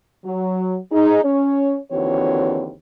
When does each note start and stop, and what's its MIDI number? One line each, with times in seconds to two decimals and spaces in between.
0.25 0.77 54
0.92 1.21 63
0.92 1.21 68
1.24 1.77 61
1.24 1.77 73
1.92 2.72 39
1.92 2.72 50
1.92 2.72 52
1.92 2.72 60
1.92 2.72 66
1.92 2.72 73